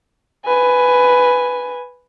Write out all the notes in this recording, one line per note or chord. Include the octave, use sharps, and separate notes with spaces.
B4 G#5